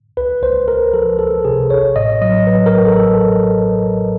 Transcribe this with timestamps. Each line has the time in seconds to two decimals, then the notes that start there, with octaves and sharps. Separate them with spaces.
0.17 C#2 B4
0.42 C#2 C5
0.68 C#2 A#4
0.93 F3 A4
1.19 C#2 A4
1.45 C3 G#4
1.70 A1 C#5
1.96 A2 D#5
2.22 F#3 D#5
2.47 F#3 B4
2.66 A#4
2.73 A1
2.86 A4
2.96 A4